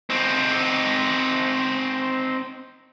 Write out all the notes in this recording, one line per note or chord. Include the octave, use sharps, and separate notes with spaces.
C4 D#4